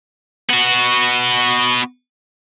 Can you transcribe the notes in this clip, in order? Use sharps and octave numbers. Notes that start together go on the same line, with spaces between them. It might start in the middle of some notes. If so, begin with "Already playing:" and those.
B3 F#4